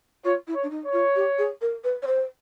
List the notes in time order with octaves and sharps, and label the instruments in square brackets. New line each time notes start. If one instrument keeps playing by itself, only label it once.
[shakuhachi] F4 [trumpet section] C#5
[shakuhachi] E4
[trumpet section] C#5
[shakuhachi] D4
D#4
[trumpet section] C#5
[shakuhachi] F4
G4
G#4
A#4
B4
C#5
C5